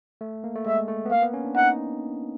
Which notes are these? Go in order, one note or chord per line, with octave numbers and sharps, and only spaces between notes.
A3
A#3
A3
G#3 E5
A3
B3
A#3 F5
B3
C#4
D4
D#4 F#5